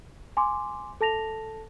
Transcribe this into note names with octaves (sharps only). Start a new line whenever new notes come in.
G#5 C6 D6
A4 A5 A#6 F7